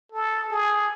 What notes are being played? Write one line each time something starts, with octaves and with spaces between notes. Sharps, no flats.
A4
G#4